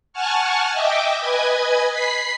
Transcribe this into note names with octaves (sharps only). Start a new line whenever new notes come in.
F#5 G#5 A5 C#6 F6
D#5 E5 G5 D6
B4 D#5 G#5 G#6
B5 B6 C7